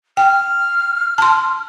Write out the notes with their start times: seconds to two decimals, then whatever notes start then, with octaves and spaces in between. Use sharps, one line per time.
0.17 G5 F6
1.18 A5 C6